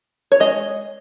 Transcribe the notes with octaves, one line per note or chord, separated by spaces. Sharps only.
C#5
G#3 D#5